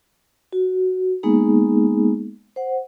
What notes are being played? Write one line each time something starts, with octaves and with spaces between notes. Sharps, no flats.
F#4
G#3 A#3 B3 D#4 G#4
C5 F#5